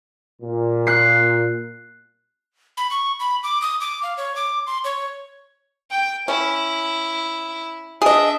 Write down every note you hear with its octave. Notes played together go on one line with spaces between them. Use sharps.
A#2
F#6 C7
B5
C#6
B5
D6
D#6
D6
F5
C#5
D6
C6
C#5
G5
C#4 E4
D4 G#4 D#5 E5